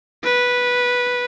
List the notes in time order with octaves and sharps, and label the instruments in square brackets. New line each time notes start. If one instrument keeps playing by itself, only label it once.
[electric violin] B4